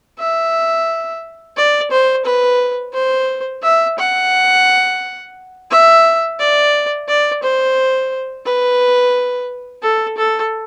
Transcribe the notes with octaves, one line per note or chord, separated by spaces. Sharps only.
E5
D5
C5
B4
C5
E5
F#5
E5
D5
D5
C5
B4
A4
A4